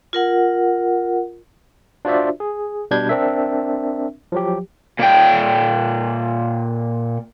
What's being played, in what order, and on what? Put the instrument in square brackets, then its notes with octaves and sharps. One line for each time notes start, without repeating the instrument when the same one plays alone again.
[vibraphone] F4 A#4 F#5
[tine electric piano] D4 F4 F#4 C5 D5 E5
G#4
B2 G3 D4 G6 G#6
C4 D4 A#4 E5
F3 F#3 G4
[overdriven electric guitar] A#2 G5